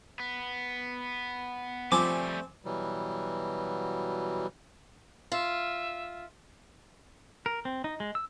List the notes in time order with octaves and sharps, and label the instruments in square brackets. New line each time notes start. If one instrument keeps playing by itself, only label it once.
[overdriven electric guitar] B3
[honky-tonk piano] F3 G#5 [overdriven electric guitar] G3 A3 [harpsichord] C4 [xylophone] D6
[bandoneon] B2 E3 F#3 G3
[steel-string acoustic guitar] F4 [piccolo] E5
[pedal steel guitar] A#4
C4
D#4
G#3
E6